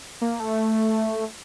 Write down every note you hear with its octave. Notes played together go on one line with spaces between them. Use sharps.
A#3
A3